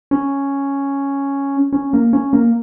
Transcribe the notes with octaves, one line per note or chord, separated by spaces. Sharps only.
C#4
C#4
A#3
C#4
A#3